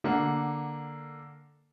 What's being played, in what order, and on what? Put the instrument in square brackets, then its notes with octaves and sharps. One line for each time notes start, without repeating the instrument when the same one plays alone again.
[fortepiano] D3 A#3 F#5